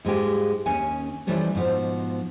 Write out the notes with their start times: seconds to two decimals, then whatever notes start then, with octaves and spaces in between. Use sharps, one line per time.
0.05 G#2 G#3 F4 G4
0.66 D#2 C#4 G#5
1.27 E3 F3 G3 A3 C#4
1.55 G#2 B2 F3